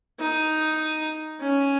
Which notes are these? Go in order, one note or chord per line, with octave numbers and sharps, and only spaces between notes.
D#4
C#4